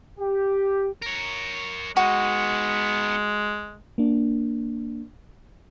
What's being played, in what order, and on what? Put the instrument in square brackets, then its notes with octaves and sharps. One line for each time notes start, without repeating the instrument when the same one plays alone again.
[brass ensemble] G4
[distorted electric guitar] A#4 C#5
[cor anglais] G#3 [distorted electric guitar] B3 D#4 [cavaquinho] F#4
[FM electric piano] A#3 D4